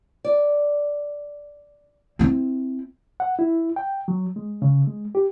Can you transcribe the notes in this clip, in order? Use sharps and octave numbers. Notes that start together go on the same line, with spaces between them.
D5
C4 E4
F#5
E4
G5
F#3
G#3
C#3
G#3
G4